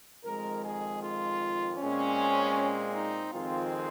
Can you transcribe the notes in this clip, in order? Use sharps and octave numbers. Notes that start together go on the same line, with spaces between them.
F2 D#3 G#3 A#4
G#4
F4
A#2 G#3 C4 C#4
D#4
F2 D#3 G#3 C4 F4